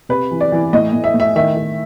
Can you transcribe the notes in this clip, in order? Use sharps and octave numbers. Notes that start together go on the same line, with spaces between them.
C3 B4
E3
D5
E3
A2 D#5
A2
E5
A2
E5
D#3 E5
D#3